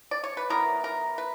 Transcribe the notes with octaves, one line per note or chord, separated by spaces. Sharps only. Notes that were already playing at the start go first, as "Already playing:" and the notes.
D5
C#5
B4
F#3 B3 E4 A#4
A#4
B4